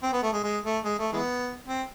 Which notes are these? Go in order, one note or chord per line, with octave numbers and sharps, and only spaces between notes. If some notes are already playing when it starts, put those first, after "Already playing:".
C4
B3
A3
G#3
G#3
A3
G#3
A3
E3 G#3 B3
C4